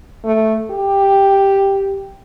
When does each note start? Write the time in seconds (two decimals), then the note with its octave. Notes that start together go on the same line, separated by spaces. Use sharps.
0.25 A3
0.71 G4